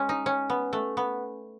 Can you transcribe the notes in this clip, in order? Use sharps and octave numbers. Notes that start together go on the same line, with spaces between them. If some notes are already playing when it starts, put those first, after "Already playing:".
Already playing: G#3 C#4
D#4
C#4
B3
A3
B3